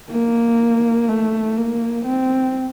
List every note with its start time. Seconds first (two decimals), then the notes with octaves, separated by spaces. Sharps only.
0.11 A#3
1.09 A3
1.57 A#3
2.05 C4